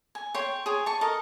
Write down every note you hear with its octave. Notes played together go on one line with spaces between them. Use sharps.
G#5
C#5 G5 C6
G#4 C#5
A5 C#6
A4 A#4 D#5